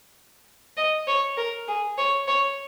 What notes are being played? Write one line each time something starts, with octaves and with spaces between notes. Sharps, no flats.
D#5
C#5
A#4
G#4
C#5
C#5